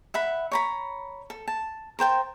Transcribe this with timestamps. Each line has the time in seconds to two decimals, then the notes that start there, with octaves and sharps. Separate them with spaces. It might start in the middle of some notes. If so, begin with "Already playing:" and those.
0.14 E5 F#5 B5
0.52 C#5 A#5 B5
1.30 A4
1.48 A5
1.99 A#4 C5 G5 A5